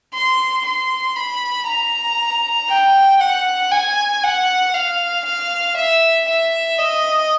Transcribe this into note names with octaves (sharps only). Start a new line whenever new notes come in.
C6
C6
B5
A#5
G5
F#5
G#5
F#5
F5
F5
E5
E5
D#5